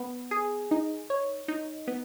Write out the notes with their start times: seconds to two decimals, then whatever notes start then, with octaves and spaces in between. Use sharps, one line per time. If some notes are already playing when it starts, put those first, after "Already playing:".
Already playing: B3
0.31 G#4
0.71 D#4
1.10 C#5
1.48 D#4
1.88 B3